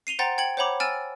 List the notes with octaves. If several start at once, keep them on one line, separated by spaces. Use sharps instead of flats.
C7 D#7 F7 G7
C5 F#5 G5 A#5 C6 A6
G5 G#6 C#7 F#7
C5 C#5 F#5 A#5 B5 D6
G#5 E6 F6 A6 D7 E7